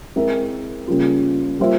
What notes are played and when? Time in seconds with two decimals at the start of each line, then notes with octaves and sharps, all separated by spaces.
0.16 G#3 C4 E4 A#4 E5
0.88 C#3 G3 A#3 C#4 F4
1.59 G3 A#3 F4 C5 E5